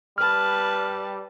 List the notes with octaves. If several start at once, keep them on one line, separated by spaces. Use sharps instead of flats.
G3 B4 A5 F6